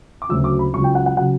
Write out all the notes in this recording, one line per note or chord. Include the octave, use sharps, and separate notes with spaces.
D6
D2 C#3 F#3 E6
D6
B5
C#2 C#3 F#3 C#6
G5
F#5
F#5
C#3 F#3 F#5